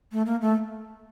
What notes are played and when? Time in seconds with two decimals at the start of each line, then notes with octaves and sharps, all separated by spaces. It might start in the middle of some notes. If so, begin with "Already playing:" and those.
0.12 A3
0.26 A#3
0.41 A3